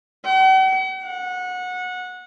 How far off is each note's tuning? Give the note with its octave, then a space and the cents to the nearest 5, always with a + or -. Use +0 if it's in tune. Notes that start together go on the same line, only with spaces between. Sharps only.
F#5 +45
F#5 -20